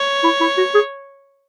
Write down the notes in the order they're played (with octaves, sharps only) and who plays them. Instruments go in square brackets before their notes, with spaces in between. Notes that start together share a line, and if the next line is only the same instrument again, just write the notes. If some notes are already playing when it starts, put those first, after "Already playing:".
Already playing: [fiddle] C#5
[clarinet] E4
E4
F#4
G#4